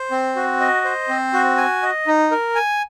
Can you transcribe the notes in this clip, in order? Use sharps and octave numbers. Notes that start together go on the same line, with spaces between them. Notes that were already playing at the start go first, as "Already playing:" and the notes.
Already playing: C5
C4
F#4
D#5
C5
C4
F#4
G#5
D#5
D#4
A#4
G#5